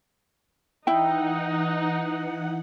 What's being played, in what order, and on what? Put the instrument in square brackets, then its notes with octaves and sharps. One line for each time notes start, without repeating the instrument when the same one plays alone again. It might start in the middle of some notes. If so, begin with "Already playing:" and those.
[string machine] E3 F#5 [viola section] D#4 [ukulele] E4 G5